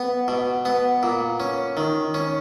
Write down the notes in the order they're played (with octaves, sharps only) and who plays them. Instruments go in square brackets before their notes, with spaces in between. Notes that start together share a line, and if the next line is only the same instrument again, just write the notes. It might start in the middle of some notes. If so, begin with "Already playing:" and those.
Already playing: [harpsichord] B3
B2
B3
A#2
C#4
D#3
C#4